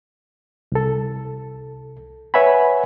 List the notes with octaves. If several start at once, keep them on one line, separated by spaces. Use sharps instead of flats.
C2 A4
B4 C#5 E5 F#5 G#5 B5